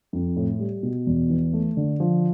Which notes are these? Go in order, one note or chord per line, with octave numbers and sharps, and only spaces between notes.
F2
A2
G3
B2
E2
E3
A3
D3
F3